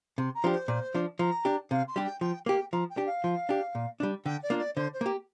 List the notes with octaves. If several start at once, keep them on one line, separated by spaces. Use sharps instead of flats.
C3 C6
A#5
F3 D4 G4
C5
A#2
F3 D4
F3 A#5
D4 G4
C3 F5
C6
G3 D4 G4
G5
F3 G5
A#3 G4 G5
F3 A#5
G5
D4 G4
F5
F3
D4 G4
A#2
G3 D4
D3 G5
D5
A#3 D4 F4
D5
D3 C5
C5
A#3 G4